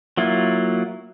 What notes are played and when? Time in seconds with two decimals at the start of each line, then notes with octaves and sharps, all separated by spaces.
0.17 F#3 A#3 E4 F4